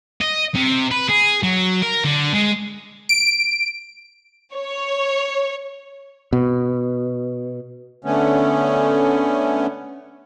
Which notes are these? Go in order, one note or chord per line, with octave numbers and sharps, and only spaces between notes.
D#5
C3
B4
G#4
F#3
A#4
D3
G#3
D7
C#5
B2
D3 A3 B3 C#4